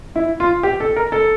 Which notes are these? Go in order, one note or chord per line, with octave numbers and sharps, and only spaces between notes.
E4
F4
G4
A4
A#4
A4